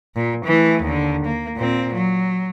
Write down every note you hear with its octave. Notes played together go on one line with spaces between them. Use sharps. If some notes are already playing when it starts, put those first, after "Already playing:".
A#2
E3 A3
D#2 D3
A#3
A#2 C4
F#3